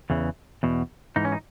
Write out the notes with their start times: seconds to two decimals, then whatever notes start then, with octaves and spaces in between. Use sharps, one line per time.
0.10 E2 C#3 E3
0.63 E2 B2
1.16 G#2 E3 D#4
1.25 C#4
1.32 D#4